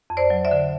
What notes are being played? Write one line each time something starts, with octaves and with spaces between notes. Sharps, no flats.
F2
C5 D5
F#3
D5 E5
D3